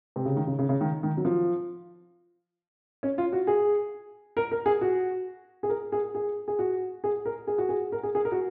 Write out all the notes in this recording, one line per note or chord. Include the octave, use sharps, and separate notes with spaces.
C3
C#3
D#3
C#3
C#3
C#3
D#3
D#3
F#3
F3
C#4
F4
F#4
G#4
A#4
A#4
G#4
F#4
G#4
A#4
G#4
G#4
G#4
F#4
G#4
A#4
G#4
F#4
G#4
A#4
G#4
G#4
A#4
F#4